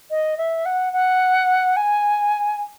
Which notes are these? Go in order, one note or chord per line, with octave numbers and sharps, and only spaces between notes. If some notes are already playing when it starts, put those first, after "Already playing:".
D#5
E5
F#5
F#5
G#5